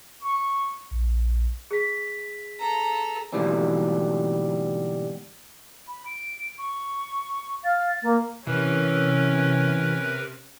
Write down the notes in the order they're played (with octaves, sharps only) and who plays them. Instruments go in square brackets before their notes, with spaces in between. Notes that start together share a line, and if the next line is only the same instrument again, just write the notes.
[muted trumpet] C#6
[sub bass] A#1
[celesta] G#4 B6
[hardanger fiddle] A4 A#5
[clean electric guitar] D2 G#2 B2 E3 G3 C4
[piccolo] B5
D7
C#6
[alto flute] F5 [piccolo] A6
[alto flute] A#3
[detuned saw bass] C3 [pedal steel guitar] E3 [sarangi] C#4 [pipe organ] A#4 B4